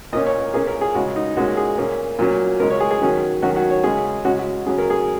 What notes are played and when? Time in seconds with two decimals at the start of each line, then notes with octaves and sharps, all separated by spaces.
0.13 A#2 A#3 C#4 D#5
0.26 C#5
0.40 A#4
0.54 A#2 A#3 C#4 G#4
0.67 A#4
0.81 G#4
0.95 C#3 G#3 C#4 F#4
1.16 D#4
1.37 A#2 G#3 C#4 F#4
1.57 G#4
1.78 A#2 A#3 C#4
2.19 A#2 F#3 C#4
2.60 C#3 G#3 C#4 A#4
2.70 C#5
2.80 G#4
2.91 G#4
3.01 D#3 F#3 C#4
3.42 D#3 F#3 C#4 F#4
3.56 F#4
3.70 C#5
3.83 C#3 G#3 C#4 G#4
4.25 C#3 G#3 C#4 F#4
4.39 F#4
4.66 C#3 F#3 C#4 G#4
4.78 A#4
4.90 G#4